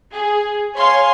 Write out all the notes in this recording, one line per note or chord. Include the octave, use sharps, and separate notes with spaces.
G#4
C#5 F5 G#5 C6